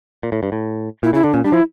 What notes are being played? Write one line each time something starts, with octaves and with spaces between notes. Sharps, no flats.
A#2
A2
G2
A2
A#2 E4
C#3 E4
D3 D4
A#2 C#4
G3 D4
F3 E4